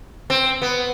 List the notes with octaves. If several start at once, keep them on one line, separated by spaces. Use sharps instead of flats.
C4
B3